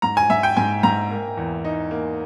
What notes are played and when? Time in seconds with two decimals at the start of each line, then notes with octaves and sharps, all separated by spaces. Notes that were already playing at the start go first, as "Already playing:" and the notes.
0.02 G#2 A#5
0.17 G#5
0.30 G#2 E5
0.43 G5
0.57 G#2 G#5
0.83 G#2 A#5
1.11 A#3
1.37 E2
1.65 D#4
1.91 A#3